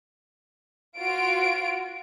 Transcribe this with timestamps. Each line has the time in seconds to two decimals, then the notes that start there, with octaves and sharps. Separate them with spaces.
0.98 F4 F#4 D7